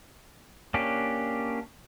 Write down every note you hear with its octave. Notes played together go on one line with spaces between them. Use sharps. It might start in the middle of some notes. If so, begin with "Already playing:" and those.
A#3 C#4 D4 G4